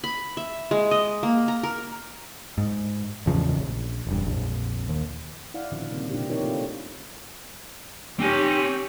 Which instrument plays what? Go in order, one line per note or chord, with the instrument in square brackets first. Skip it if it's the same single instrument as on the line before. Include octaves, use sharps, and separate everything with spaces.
[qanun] B5
E5
G#3
D#5
A#3
A#5
A#4
[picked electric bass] G#2
A1 E2 C#3 F3
A#1
E1 G2
A#1 F2
D#2
[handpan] E4 D5 F5 F#5
A#2 D3 D#3 F3 C#4
C#3 G3 A#3 C4
B2 D4 E4 F4 G4
C4 D#4 E4 G4 A#4 C#5
A3 C4 F4 A4
[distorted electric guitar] C4 G#5 [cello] G4 C#5